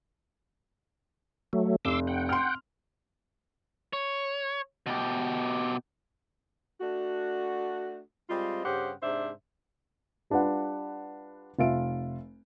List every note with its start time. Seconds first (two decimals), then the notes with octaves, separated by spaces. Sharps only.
1.53 F#3 A3
1.85 F1 C6 D6 E6
2.07 F#5 G5
2.29 C6 F6
3.93 C#5
4.86 B2 G4
6.81 A3 D4 F#4
8.29 G3 G#3 C4 F4
8.64 G2 C#3 G4 C5 F#5
9.03 G#2 C3 D4 C5 E5
10.30 G3 D4 F4 B4 F#5
11.59 F1 F4 E5 D7